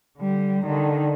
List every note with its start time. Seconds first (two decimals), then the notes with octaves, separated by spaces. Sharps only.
0.18 D3 G3
0.66 D3 D#3